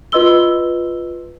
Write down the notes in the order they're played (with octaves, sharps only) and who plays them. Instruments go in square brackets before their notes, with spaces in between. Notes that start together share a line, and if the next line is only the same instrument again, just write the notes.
[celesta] F4 B4 D#5 C6 E6 G7